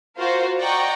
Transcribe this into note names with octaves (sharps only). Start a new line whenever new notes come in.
F4 F#4 A#4 C5 F5
D5 D#5 F#5 G5 A#5 C#6